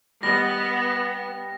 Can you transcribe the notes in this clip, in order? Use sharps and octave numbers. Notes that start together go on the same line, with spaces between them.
G3 B3 D#5 A#6